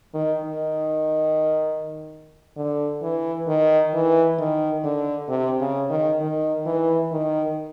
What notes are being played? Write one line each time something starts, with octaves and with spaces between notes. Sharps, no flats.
D#3
D#3
D3
E3
D#3
E3
D#3
D3
C3
C#3
D#3
D#3
E3
D#3